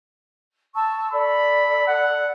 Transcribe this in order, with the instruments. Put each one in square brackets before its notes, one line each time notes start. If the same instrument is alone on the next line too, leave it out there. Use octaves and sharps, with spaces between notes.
[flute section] A5 C#6 E6
[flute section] A4 D5 [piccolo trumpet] B5
[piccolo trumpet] F#5